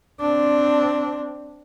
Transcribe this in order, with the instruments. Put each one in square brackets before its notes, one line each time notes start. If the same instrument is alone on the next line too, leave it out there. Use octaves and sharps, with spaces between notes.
[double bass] C4 D4